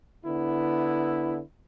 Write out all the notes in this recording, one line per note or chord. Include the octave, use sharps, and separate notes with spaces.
D3 B3 E4